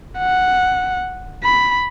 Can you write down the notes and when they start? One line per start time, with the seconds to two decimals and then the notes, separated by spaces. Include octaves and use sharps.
0.18 F#5
1.44 B5